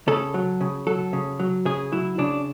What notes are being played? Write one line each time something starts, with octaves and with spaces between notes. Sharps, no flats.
C#3 A4
F#3
C#3
F#3 A4
C#3
F#3
C#3 G#4
F#3 E4
C#3 D4